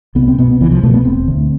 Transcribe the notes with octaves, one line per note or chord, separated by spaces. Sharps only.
C2 B3
C4
B2 B3
C2 E3
F3
B2 A3
B3
E1 C4
D2 D3